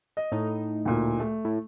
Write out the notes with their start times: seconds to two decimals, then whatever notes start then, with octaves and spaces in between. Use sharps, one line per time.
0.17 D#5
0.32 A2 D#4
0.85 D2 A#2
1.20 A3
1.45 A2